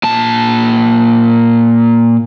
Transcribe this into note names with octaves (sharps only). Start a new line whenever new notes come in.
A#2 A5